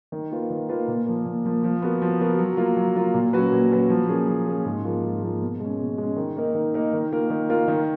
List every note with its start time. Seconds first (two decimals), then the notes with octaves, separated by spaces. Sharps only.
0.12 D#3
0.30 A#3 F4 B4
0.50 D#3
0.69 A#3 F4 B4
0.88 A#2
1.06 F3 A#3
1.25 A#2
1.45 F3 A#3
1.64 F3
1.82 B3 F#4 A#4
2.02 F3
2.20 B3 F#4 A#4
2.39 F#3
2.57 A#3 F4
2.77 F#3
2.96 A#3 F4
3.14 A#2
3.33 F#3 C#4 F#4 B4
3.52 A#2
3.71 F#3 C#4 F#4 B4
3.90 F3
4.09 A#3 C#4 G#4
4.28 F3
4.47 A#3 C#4 G#4
4.66 G#2
4.84 F3 A#3 F4
5.04 G#2
5.22 F3 A#3 F4
5.42 B2
5.60 G#3 C#4
5.79 B2
5.98 G#3 C#4
6.16 D#3
6.36 A#3 D#4 A#4
6.55 D#3
6.74 A#3 D#4 A#4
6.93 D#3
7.12 A#3 F4 A#4
7.30 D#3
7.49 A#3 F4 A#4
7.68 D#3